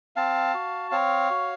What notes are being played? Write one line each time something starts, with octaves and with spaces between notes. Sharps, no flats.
C4 F5 A5
F#4
C4 C#5 F5
F#4